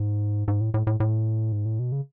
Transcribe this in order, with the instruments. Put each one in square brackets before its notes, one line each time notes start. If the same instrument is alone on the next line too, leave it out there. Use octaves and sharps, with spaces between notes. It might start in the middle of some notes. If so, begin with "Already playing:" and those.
Already playing: [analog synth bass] G#2
G#2
A2
A2
A2
A2
G#2
A2
B2
C#3